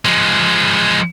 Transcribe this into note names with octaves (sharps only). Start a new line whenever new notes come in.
F3 G#3